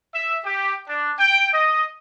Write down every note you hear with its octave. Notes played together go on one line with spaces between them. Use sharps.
E5
G4
D4
G5
D#5